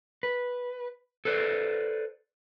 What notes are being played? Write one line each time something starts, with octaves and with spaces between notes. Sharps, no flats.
B4
A4 B4 C5 D5